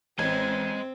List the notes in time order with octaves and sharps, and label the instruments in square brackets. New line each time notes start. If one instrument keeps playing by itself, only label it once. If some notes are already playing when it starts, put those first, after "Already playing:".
[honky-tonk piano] A1 [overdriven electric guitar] G#3 D#5 [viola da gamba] C4 [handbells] G#6